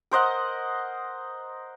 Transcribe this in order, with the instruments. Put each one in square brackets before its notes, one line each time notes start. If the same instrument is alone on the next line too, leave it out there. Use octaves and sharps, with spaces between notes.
[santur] A#4 C5 D#5 F#5